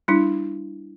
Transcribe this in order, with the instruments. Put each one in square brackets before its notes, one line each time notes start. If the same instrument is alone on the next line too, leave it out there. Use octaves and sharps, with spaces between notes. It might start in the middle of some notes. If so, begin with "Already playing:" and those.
[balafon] G3 D4 E4